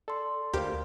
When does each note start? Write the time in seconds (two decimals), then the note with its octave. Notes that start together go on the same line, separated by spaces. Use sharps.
0.08 A4 D5 C6
0.53 D2 G4 A#4 C5 F5